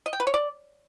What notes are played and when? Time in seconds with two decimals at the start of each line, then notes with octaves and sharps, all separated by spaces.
0.06 D#5
0.13 G5
0.20 B4
0.27 C#5
0.34 D5